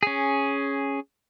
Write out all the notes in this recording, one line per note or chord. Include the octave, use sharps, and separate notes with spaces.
C#4 G#4